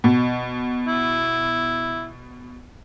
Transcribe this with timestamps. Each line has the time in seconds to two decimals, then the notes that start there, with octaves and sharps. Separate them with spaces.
0.04 B2
0.87 E4